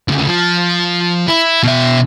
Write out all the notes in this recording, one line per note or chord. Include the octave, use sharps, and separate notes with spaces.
D2 C#3
F3
E4
B2 E5